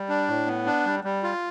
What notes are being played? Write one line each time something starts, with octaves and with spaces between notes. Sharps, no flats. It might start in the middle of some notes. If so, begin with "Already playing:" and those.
Already playing: G3
D4
A2
B3
D4
G3
G3
F4